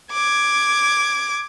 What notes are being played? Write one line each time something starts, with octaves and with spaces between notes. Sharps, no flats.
D6 G#6